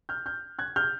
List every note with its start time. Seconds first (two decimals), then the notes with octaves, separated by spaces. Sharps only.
0.09 F6 G6
0.26 F6 G6
0.59 F#6 G#6
0.76 F6 G6